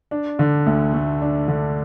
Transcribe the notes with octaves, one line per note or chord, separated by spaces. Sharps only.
D4
D3
D2
A3
D4
D3